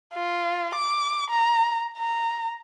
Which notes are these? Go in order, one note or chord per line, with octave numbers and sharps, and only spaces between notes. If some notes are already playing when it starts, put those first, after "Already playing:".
F4
D6
A#5
A#5